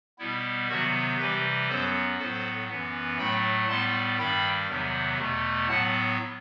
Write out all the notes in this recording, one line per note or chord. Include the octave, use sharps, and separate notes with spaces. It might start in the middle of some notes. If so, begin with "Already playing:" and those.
B2 G3 B3 E4
C3 D#3 F#3 B3 F#4
C3 E3 G3 G4 B4
F#2 F#3 B3 A4 C5
A2 F#3 B3 A4 C5
F#2 E3 B3
A2 F#3 A3 G5 B5
A2 G3 B3 A5 C6
G2 D#3 G3 G5 B5
E2 C3 D#3 F#3 B3
E2 B2 A3
A2 F#3 B3 F#5 A5